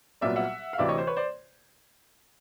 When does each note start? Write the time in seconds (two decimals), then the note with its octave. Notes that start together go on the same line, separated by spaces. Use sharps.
0.21 C2 A#2 F#3 B3 D5 E5
0.36 E5 F#5
0.73 F5
0.78 D2 C3 E3 D5 E5
0.88 C#5 D#5
0.98 C5
1.07 B4 C#5
1.17 C5 D5